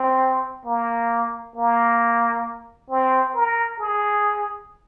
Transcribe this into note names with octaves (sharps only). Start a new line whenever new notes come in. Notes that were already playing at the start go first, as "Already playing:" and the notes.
Already playing: C4
A#3
A#3
C4
A#4
G#4